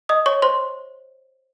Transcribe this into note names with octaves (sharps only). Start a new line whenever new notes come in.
D#5 D#6
C#5 C#6
C5 C6